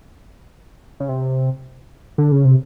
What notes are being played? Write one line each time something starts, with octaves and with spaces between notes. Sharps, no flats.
C#3
C3
D3
C#3
C3